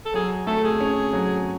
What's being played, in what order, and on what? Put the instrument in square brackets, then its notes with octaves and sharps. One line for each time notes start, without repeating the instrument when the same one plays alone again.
[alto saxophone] A4
[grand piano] F#3 [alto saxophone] G#4
[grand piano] A3 [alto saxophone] A4
[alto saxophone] G#4
[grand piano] C#4
F#3